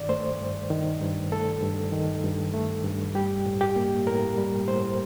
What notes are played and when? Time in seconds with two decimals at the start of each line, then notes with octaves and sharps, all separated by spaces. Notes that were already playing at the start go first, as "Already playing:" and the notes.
Already playing: G2 D#3 D5
0.09 A3 C5
0.40 G2
0.70 D#3
1.01 G2
1.32 A3 A4
1.62 G2
1.92 D#3
2.24 G2
2.54 A3
2.84 G2
3.15 G3 G4
3.46 A2
3.61 G4
3.76 A#3
4.06 A2 A#4
4.38 G3
4.68 A2 C5